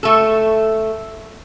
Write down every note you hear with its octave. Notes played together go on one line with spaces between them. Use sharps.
A3 A4